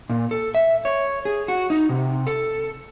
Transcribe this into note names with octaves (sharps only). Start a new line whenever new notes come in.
A#2
A4
E5
C#5
G#4
F#4
D#4
C3
A4